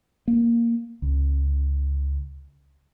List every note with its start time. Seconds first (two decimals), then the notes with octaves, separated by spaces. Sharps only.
0.28 A#3
1.02 C#2